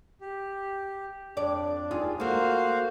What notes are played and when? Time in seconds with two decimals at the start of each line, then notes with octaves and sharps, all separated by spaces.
0.21 G4
1.37 F2 D4 D5
1.91 D#2 F4 G#4
2.20 A#3 F#4 A4 C5 F5